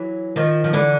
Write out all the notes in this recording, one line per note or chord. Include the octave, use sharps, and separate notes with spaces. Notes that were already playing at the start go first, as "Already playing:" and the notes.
Already playing: E3 F#3
D#3 F3
F3
D3 E3